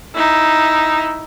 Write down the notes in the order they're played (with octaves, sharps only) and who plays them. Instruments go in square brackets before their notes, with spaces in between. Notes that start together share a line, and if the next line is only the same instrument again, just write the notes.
[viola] D#4 E4